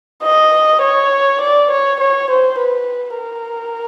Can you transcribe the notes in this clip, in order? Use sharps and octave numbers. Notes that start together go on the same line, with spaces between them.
D#5
C#5
D5
C#5
C#5
C5
B4
A#4